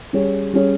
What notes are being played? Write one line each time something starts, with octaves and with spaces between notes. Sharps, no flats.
G3 C#4 G#4 C#5
G3 C#4 G#4 C#5